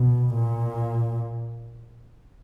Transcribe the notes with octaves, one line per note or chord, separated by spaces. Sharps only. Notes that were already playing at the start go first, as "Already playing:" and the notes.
Already playing: B2
A#2